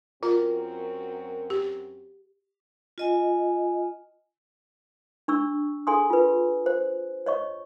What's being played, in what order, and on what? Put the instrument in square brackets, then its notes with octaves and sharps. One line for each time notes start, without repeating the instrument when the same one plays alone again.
[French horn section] F#2 C4 F#4 [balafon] F4 [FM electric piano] A#4
[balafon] G4
[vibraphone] F4 D#5 G#5
[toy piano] D4 C#6 E6
G#4 A4 G#5 C6 D#6
F4 B4
C5
C#5 D#5 C#6